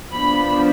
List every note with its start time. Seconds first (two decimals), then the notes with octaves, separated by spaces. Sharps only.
0.11 F3 B3 D4 B5